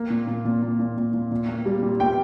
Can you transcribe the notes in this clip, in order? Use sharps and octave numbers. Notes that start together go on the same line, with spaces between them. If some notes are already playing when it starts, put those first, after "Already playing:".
Already playing: A#3
A#2
A#2
A#2
A#2
A#2
A#2
A#2
A#2
A#3
G3
A#2
A#2 G5